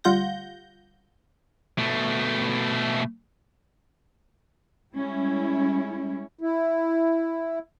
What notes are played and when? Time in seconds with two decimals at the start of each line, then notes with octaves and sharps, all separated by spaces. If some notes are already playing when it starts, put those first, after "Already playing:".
0.04 D2 G3 F4 F#5 G6 A#6
1.78 B2 A3
4.95 G3 G#3 C#4 E4
6.41 E4